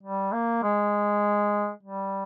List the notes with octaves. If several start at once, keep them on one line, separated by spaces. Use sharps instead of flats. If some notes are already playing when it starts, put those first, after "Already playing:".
G3
A#3
G#3
G3